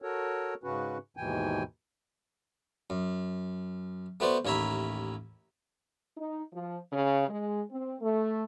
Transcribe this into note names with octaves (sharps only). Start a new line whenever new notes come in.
F#4 A4 A#4 C#5
G#2 C#3 C#4 F#4 B4
D#2 G#2 B2 E3 G5 G#5
F#2
A3 B3 F#4 C5 D5
A1 D#2 C#5 E5 A#5 B5
D#4
F3
C#3
G#3
C4
A3